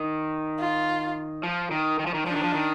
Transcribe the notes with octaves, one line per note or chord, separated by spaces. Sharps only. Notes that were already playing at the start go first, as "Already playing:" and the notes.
Already playing: D#3
F4
F3
D#3
D#3
F3
D#3
F3 D4
D#3
F3
D#3